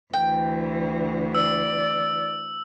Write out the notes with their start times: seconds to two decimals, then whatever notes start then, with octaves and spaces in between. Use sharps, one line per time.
0.13 D2 E3 G5
1.35 D5 E6